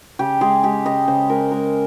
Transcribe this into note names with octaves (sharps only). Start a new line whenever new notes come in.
C#3 G4
G#3 G#4
G#3 G4
C#3 D#5
C#3 C5
G#3 A#4
G#3 A#4